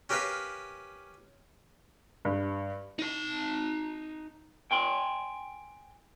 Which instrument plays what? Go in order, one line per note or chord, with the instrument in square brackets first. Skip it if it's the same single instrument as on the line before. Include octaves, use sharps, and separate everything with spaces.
[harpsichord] C#4 G4 A#4 B4 F5 B5
[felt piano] G2
[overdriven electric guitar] D#4 A5
[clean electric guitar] G5 G#5 C6